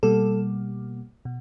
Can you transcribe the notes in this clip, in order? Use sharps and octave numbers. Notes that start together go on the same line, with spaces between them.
B2 G3 A#3 A4
B2